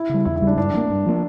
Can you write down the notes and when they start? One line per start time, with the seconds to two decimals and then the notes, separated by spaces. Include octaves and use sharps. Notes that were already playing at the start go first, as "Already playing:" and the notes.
Already playing: E4
0.09 C#3 G3
0.25 E2 E4
0.36 E4
0.42 C#3 G3
0.47 D4
0.57 G2 D4
0.74 F3
0.77 A#3
0.90 G2
1.06 F3 A#3